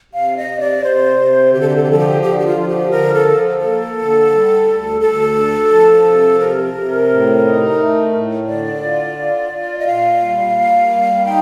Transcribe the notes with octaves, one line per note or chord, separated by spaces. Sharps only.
C3 F5
D#5
C3
D5
C3 C5
C3
D3 G4
A4
G4
A4
G4
F3 A4
G4
D3 G4
G4
F4
F3
G4
D3 A#4
A4
F3
A#3 A4
D3
G3
D2
D2 A4
D4
F3
C3
C3 A#4
C3
A2
D#4
A3
A2
D3 D5
F4
F4
F4
D#5
A#2 F5
G3
A#3
G3
D#4 G5